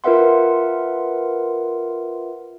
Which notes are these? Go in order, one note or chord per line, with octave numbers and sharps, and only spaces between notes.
F4 A#4 B4 E5 F#5 C6